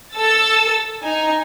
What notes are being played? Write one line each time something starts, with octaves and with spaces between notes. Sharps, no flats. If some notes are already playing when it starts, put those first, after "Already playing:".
A4 E6 A6
D#4 G#5